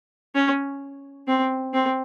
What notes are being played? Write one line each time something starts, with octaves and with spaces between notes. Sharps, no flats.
C#4
C4
C4